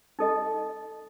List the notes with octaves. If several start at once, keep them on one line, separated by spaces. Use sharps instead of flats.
D#4 A4 D#5